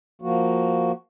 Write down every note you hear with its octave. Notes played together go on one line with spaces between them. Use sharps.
F3 A#3 F#4